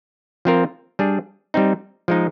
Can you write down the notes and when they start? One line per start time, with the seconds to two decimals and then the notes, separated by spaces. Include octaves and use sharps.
0.45 F3 C4 F4 A#4
0.99 G3 D4 G#4
1.54 G3 C4 D#4
2.08 F3 G#3 D#4